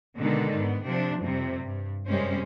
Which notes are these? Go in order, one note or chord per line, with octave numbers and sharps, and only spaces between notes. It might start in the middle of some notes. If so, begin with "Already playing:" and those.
B2 D3 D#3 G#3 D#4 A4
G#2 B3
C3 F3 D4
F2 C3 G3
G2
F#2 C3 G3 G#3 C#4 C5